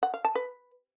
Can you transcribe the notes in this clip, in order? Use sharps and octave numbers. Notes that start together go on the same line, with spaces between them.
F#5
F5
A5
B4